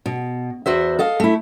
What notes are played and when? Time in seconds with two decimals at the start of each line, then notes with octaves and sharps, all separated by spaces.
0.06 B2
0.66 E2 F#4 C5 E5
0.99 A4 D#5 F5
1.20 A3 E4